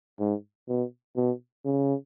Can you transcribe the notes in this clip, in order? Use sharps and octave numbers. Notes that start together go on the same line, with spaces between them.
G#2
B2
B2
C#3